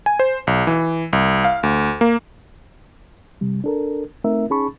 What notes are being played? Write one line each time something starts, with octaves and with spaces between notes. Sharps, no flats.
G#5
C5
B1
E3
C2
F5
D2
A#3
C3 G3
D4 A4 A#4
A3 C4 D#4 A#4 E5
C#4 D#4 G#4 A5 B5 C#6